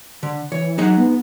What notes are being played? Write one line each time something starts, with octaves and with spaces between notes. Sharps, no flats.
D3
E3 C#5
F#3 D#4 G#4 F#5
B3